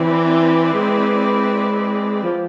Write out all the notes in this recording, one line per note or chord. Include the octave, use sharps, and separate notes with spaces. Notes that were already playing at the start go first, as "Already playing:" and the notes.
Already playing: E3 C4 E4 B4 D5
G#3
F3